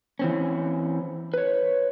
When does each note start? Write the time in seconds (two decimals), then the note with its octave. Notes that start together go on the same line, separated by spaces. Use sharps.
0.19 E3 C4 C#4
1.34 B4 C#5